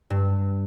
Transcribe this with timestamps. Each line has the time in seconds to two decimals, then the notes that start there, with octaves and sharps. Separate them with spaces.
0.10 G2